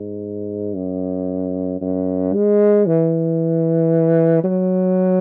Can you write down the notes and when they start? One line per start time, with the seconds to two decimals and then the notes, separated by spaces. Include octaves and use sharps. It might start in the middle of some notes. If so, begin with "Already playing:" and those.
Already playing: G#2
0.76 F#2
1.81 F#2
2.34 G#3
2.86 E3
4.44 F#3